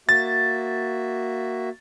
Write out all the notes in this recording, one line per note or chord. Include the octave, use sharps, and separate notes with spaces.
A#3 F#4 E5 A6